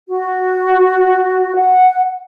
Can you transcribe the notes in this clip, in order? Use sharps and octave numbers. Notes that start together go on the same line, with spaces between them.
F#4
F#5